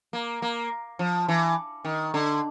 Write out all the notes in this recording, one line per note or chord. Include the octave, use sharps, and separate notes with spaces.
A#3
A#3
F3
E3
D#3
D3